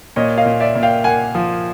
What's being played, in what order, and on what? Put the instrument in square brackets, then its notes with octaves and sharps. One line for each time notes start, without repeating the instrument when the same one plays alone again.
[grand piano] A#2 C#5 D#5
D#5 F5
A#2
D5 E5
A#2
F5 G5
A#3 F#5 G#5
F3